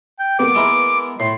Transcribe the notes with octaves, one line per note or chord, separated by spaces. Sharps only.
G5
A#3 B3 D6
G#3 E4 A#4
A2 C6